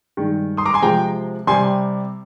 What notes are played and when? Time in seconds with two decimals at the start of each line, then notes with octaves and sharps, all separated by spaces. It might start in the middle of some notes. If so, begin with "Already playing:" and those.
0.17 G2 D#3 G#3
0.57 C6 D#6
0.66 A#5 D6
0.74 G#5 C6
0.82 C3 F3 G#3 G5 A#5
1.47 C3 G3 G#5 C6